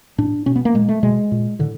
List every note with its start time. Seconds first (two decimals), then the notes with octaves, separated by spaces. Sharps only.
0.18 A2 D4
0.46 B2 C#4
0.56 B3
0.65 A#3
0.74 A#2 G#3
0.89 A3
1.03 B2 G#3
1.32 A#2
1.59 A2 D3